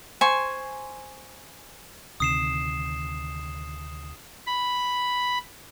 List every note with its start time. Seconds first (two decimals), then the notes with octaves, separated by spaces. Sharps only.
0.21 C5 G#5 C#6
2.20 D2 C3 D#3 D#6 C7 E7
4.46 B5